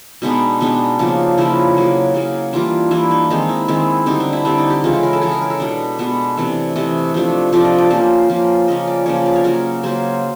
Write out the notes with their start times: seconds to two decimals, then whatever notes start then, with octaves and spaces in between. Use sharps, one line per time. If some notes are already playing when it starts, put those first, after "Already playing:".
0.22 B2 G#3 B3 D4 D#4
0.60 B2 G#3 B3 D4 D#4
0.99 C#3 F3 A#3 D4
1.38 C#3 F3 A#3 D4 E4
1.77 C#3 F#3 A#3
2.14 C#3 F#3 A#3
2.53 E3 G3 A#3 D4 F4
2.91 E3 G3 A#3 D4 E4
3.11 D#4
3.30 D#3 G#3 C4 D#4
3.49 E4
3.68 D#3 G#3 C4 E4
4.06 D3 G3 C4 D#4
4.20 D4
4.33 E4
4.45 D3 G3 C4 D4
4.58 D#4
4.70 G4
4.84 C#3 E3 G#3 F4
4.93 E4
5.03 A#4
5.13 A4
5.21 C#3 E3 G#3 G#4
5.32 A#4
5.42 A#4
5.50 A4
5.60 B2 G#3 B3 D4
5.99 B2 G#3 B3 D4
6.37 C3 E3 A3 D5
6.76 C3 E3 A3 D#5
7.14 C3 F3 A3 D4
7.53 C3 F3 A3 D4 D5
7.65 D#5
7.79 D5
7.90 F3 A#3 C#4 C5
8.30 F3 A#3 C#4
8.68 C#3 F3 A#3 C#4 D#5
8.87 D5
9.06 C#3 F3 A#3 C#4 C#5
9.16 C#5
9.26 D5
9.36 C#5
9.44 C#3 F#3 A#3 A#4
9.83 C#3 F#3 A#3 C5